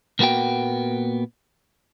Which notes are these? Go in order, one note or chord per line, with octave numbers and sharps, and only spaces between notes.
A#2 A#3 B3 F#4 G5